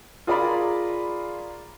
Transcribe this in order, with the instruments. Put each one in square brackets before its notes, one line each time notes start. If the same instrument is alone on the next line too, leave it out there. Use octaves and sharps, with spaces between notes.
[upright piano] F4 G#4 A#4 D5 A#5 B5